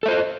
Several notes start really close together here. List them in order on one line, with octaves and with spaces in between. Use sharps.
A4 E5 C5 D#5